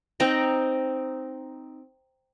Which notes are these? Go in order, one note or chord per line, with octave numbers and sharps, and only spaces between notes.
C4 D#4 G5 A#5